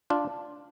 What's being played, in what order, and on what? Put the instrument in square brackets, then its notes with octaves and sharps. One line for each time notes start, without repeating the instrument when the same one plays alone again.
[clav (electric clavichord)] D4 F4